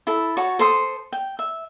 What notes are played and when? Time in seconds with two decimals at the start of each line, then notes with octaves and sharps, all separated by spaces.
0.07 E4 A4
0.37 F#4 C#5 A5 C#6
0.59 A4 C5 C6 D#6
1.13 G5
1.39 E5